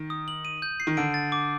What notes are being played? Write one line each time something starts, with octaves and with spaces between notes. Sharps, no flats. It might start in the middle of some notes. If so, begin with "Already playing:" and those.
Already playing: D#3
D#6
F#7
D#7
G6
C7
D#3
D3 D7
A6
D6